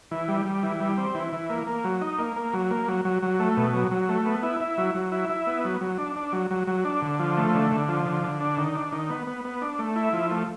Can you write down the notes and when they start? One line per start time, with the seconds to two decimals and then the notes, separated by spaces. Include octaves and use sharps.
0.11 E3
0.28 G3
0.46 G3
0.63 E3
0.80 G3
0.97 C4
1.15 E3
1.33 E3
1.50 A#3
1.67 A#3
1.84 F#3
2.01 D#4
2.19 A#3
2.36 A#3
2.53 F#3
2.70 A#3
2.88 F#3
3.05 F#3
3.22 F#3
3.40 A3
3.57 B2
3.74 F#3
3.91 F#3
4.09 A3
4.26 B3
4.43 E4
4.60 E4
4.78 F#3
4.95 F#3
5.12 E4
5.30 E4
5.47 B3
5.64 F#3
5.81 F#3
5.98 D4
6.16 D4
6.33 F#3
6.51 F#3
6.67 F#3
6.85 D4
7.02 D3
7.19 F3
7.37 A3
7.55 D3
7.72 D3
7.88 F3
8.06 D3
8.24 D3
8.40 D4
8.57 D#3
8.75 D4
8.92 D#3
9.10 B3
9.27 B3
9.45 B3
9.62 D4
9.79 A3
9.96 E4
10.13 F3
10.31 A3